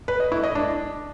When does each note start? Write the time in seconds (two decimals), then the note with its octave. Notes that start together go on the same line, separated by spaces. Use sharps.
0.08 B4
0.20 D#5
0.32 E4
0.43 D#5
0.55 D4